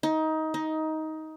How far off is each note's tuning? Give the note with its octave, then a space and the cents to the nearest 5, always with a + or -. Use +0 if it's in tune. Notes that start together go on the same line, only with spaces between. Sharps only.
D#4 +20
D#4 +15